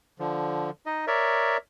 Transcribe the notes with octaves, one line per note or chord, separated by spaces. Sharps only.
D3 F3
D#4 D#5
A#4 C#5 D5 E5